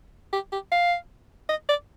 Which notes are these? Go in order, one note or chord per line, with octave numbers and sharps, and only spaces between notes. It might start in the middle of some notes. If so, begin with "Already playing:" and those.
G4
G4
F5
D#5
D5